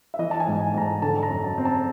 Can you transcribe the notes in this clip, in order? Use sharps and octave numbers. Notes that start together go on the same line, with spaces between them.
E5
E3 D#5
A5
G#5
G#2
G#5
G#2 A#5
A5
D3 A5
A5
A#5
F#2
A5
C4
A5